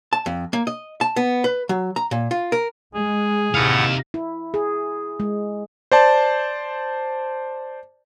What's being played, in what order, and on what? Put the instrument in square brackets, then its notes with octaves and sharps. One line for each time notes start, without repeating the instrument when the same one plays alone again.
[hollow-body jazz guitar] A5
F2
A#3
D#5
A5
B3
B4
F#3
A#5
A#2
F4
A#4
[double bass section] G#3 [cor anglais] G#4
[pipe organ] A2 F#5 [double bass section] C3 [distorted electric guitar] D#4 F5
[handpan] E4
G#4
G#3
[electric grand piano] C5 D5 A5